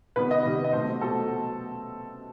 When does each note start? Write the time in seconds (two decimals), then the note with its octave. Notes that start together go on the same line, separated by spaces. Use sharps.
0.16 C3 D#3 G3 B3 B4
0.31 D#5
0.45 C3 D#3 G3 B3
0.64 D#5
0.73 B2 F#3 A3 C4 C5
1.01 B2 F#3 A3 C4 A4